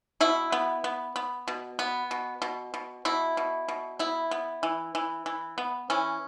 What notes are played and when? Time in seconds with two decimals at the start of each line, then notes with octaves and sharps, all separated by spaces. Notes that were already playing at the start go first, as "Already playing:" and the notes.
0.21 B2 E4
0.52 B3
0.84 B3
1.16 B3
1.48 B2
1.79 B3
2.11 B2
2.42 B2
2.74 B2
3.05 B2 E4
3.37 B2
3.68 B2
3.99 B3 E4
4.31 B3
4.63 E3
4.95 E3
5.26 E3
5.58 B3
5.90 E3 C#4